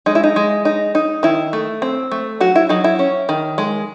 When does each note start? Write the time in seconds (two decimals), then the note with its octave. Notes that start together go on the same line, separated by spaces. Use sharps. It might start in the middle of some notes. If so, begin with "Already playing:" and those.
0.06 G#3 D#4
0.15 E4
0.24 D#4
0.36 G#3
0.65 D#4
0.95 D#4
1.23 D#3 E4
1.53 A3
1.82 C4
2.11 A3
2.40 F#3 F#4
2.56 E4
2.69 F#3 D#4
2.84 E4
2.99 C#4
3.29 D#3
3.58 G#3